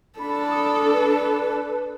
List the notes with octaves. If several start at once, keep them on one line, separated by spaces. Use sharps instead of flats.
D4 A4 B5
D#6
B4